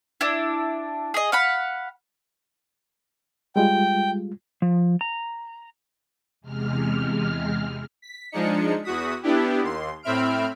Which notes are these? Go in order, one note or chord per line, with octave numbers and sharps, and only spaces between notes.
D4 E4
G#4 D#5
F5 F#5 B5
G3 G#3 F4 G5
F3
A#5
E2 C3 G#3 F6
B6
F3 G#3 D4 D#4 C#7
E2 F#4 D#6 B6
B3 D4 E4 G4
D#2 C6
A2 C4 E5 B5 F6 D7